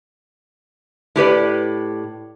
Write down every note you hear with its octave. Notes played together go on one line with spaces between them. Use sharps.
A2 G4 B4 D5